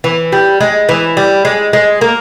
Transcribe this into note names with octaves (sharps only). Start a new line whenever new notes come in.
E3
G3
G#3
E3
G3
G#3
G#3
A#3